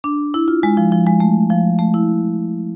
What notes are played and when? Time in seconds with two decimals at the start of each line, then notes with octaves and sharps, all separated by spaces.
0.04 D4
0.34 E4
0.48 F4
0.63 G#3
0.77 F3
0.92 F3
1.07 G#3
1.20 A3
1.50 F3
1.79 A3
1.94 E4